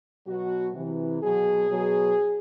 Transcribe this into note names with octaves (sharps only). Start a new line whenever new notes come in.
B2 F#3 F#4
C3 E3
B2 F#3 G#4
B2 F#3